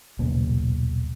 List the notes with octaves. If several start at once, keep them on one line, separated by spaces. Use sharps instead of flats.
D#1 B1 C#3 A#3